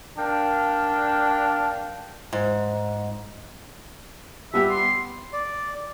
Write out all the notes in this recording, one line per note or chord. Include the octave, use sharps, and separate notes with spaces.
D4 A#4 F5 G5
G#2
G3 B3 G4 E5
C6
D5